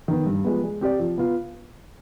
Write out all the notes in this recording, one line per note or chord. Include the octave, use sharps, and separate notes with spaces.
D#3 B3
G2
F3 G#3 B3
G#3
C4 G4 D5
F3
B3 F4